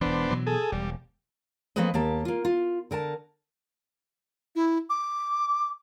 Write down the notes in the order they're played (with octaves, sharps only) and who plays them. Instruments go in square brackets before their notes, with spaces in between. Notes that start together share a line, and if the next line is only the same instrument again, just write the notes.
[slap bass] E1 E3 [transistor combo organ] B3 D4 C5
[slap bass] B2 E3 F#3
[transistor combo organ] G#4 A4
[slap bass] E1 [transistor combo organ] G3
[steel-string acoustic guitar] F3 A3 A#3 C4 B4 D#5
D#2 A#3 G4 A5
A#3 F4
F4
D3 A#4 G#5 A5
[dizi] E4
D6